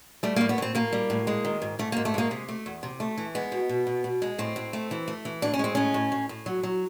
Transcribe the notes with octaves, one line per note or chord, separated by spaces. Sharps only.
G3 A3
A#3
A2
B3
A2 C4
A2 A#3
G3
A2
G#3
D#3
G#2
G#2 A3
A#3
G#2
A3
G#3 A#3
C3
A3
E2
C3
A3
E3
G#3 B3
B2
B2
B2
B2
G#3
A2 C4
A2
A3
E3
A3
E3
A2 D4
C#4
G#3 C4
A2 C#4
A2
A2
A2
F#3
F#3